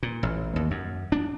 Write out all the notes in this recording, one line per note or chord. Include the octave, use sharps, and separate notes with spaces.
A#2
A1
D#2
F#2
D4